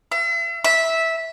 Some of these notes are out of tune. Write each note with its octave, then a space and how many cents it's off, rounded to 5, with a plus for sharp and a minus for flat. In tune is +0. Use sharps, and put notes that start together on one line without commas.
E5 +45
E5 -10